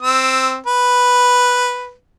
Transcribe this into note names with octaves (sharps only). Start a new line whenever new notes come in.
C4 E6
B4